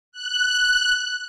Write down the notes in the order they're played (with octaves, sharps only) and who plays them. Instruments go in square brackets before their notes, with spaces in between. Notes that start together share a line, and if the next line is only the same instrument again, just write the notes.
[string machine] F#6